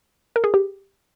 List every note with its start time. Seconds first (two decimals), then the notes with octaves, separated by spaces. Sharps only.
0.36 A#4
0.44 G#4
0.54 G4